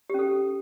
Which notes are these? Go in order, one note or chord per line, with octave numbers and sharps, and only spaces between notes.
C#4 G4 A4